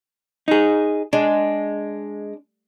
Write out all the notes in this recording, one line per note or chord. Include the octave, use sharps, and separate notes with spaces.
D#4 G#4
G#3 D4